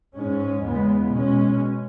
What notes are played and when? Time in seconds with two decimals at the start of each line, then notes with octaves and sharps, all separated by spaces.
0.15 G#2 G#3 C#4
0.63 E2 C#3 G#3 B3
1.12 B2 G#3 C#4